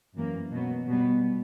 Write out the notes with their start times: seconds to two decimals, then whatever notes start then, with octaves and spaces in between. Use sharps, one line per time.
0.14 F#2 E3 A#3
0.52 B2 F#3 B3
0.87 B2 G3 B3